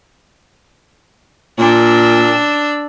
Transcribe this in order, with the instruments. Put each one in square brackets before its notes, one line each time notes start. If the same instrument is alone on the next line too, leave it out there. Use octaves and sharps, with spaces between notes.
[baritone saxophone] A#2 [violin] D4 E6